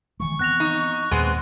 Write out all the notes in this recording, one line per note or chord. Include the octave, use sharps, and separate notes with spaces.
D#3 E3 G#3 C#6
E3 B3 C4 F#6 A#6 F7
D#4
D#2 A#2 F#3 G#3 B3 C4